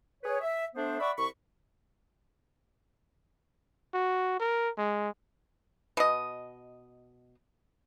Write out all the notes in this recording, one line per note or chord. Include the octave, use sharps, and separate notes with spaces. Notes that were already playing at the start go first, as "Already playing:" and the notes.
G#4 B4 C#5
E5
A3 B3 D4 C5
D5 E5 F#5 B5 C#6
C2 B5 C#6
F#4
A#4
G#3
B2 D#5